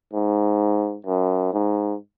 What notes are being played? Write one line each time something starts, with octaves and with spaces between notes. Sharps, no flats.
G#2
F#2
G#2